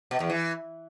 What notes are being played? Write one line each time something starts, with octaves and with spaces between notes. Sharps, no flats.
B2
E2
E3